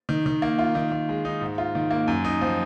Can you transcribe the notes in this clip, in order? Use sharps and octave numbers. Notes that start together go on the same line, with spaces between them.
D#3
D#3
A#3
F4
D#3
D#3
G#3
D#4
G#2
F4
D#3
A#3
F#2
D#4
F3